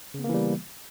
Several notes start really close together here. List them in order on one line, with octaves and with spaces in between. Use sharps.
C#3 B3 A#3 E3 G3